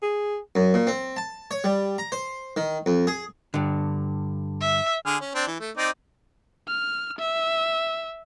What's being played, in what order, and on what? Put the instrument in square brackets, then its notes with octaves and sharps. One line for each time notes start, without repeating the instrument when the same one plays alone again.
[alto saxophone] G#4
[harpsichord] F#2
A#2
C4
A5
C#5
G3
A#5
C5
D#3
F2
G#4
[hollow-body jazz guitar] G2 D3
[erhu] E5
[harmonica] D3 G#4 F6
C#4
C4 D4
E3
A3
C4 D#4 D5
[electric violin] F6
E5